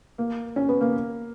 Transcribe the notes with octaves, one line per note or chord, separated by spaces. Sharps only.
A#3
C#4
B3
A#3